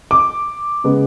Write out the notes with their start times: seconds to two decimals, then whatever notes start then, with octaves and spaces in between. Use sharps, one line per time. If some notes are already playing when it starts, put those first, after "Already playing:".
0.11 D6
0.84 C#3 G#3 B3